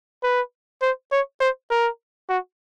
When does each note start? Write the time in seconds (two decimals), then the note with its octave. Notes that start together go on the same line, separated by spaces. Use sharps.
0.23 B4
0.82 C5
1.12 C#5
1.40 C5
1.70 A#4
2.29 F#4